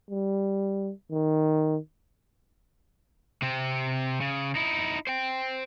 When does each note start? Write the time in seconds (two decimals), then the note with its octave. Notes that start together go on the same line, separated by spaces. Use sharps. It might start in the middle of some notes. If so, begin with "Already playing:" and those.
0.10 G3
1.11 D#3
3.42 C3 C4
4.21 C#3
4.55 D#4 E4
5.07 C5 G5